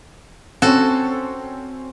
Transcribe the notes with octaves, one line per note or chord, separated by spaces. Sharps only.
C4 C#4 F#4 A4